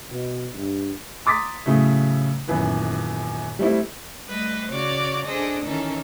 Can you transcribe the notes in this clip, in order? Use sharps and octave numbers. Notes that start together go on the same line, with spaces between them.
B2
G2
A#5 C6 D6 D#6 A6 B6
A2 C#3 F#3 A3
D#1 F#2 E3 B3 B4
G3 A3 C4 E4
G3 A3 B4 D#5
C#3 F#4 C#5 D5 D6
D4 G#4 A4 C5 D#5
D#3 E3 C#4 D#4 A4